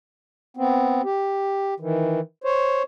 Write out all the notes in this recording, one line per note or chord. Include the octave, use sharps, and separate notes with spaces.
B3 C4
G4
D#3 E3
C5 C#5